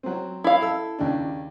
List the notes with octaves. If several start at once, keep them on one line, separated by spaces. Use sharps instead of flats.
F#3 C4
E4 F5
A4 E6
D#2 C#3 D4